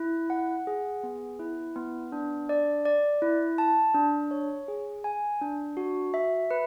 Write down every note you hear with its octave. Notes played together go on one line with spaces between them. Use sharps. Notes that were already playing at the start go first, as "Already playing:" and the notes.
Already playing: E4
F#5
G#4
B3
E4
B3
D4
D5
D5
E4
A5
D4
C#5
G#4
G#5
D4
F#4
E5
B4